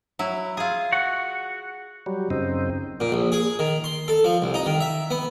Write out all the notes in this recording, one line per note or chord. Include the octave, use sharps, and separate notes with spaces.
F#3 E4
F4 G#4
F#4 F#5
F#3 G3
F#2 C#3 C4 D#4
A#2
A#1
G#4
D#3
C6
A4
F3
C2
D#4
D#3
E5
B3